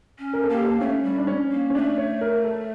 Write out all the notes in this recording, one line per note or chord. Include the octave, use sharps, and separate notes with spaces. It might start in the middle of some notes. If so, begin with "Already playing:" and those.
C#4
A#4
A4
A#3
G4
A4
A3 C#4
G3
D4
C#4
A#3
C#4
A3 D4
C#5
A#4
A4